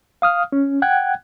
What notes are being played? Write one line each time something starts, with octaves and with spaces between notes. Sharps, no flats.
F5 D#6 F6
C#4
F#5 G5 F#6 G#6